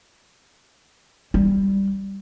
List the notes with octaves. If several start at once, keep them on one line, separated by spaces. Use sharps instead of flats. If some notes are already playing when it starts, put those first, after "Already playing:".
G3